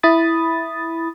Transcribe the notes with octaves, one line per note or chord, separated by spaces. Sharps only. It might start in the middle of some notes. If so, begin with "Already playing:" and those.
E4 B5 D#6 A6